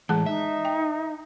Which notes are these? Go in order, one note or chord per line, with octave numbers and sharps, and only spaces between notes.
A2 E3 G#3 G#4 A5
D#4 E5
G5